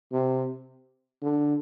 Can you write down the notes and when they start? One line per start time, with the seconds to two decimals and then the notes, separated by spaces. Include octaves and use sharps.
0.12 C3
1.22 D3